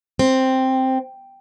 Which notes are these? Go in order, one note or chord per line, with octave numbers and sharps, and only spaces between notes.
C4